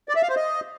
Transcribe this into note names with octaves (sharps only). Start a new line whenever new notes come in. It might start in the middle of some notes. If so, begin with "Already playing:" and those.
D5
E5
F5
C5
D#5